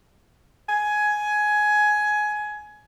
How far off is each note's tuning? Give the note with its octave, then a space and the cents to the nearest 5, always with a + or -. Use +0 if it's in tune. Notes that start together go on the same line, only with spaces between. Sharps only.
G#5 +15